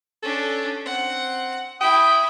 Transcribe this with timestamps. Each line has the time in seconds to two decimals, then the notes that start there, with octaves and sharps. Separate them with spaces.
0.23 C#4 D4 A4
0.86 C4 F#5
1.81 E4 G5 B5 D#6